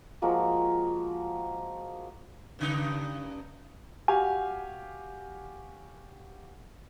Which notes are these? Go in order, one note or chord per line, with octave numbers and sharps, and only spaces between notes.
F3 G#3 A#3 F#4
G2 C#3 D#4
F#4 G4 F5 G#5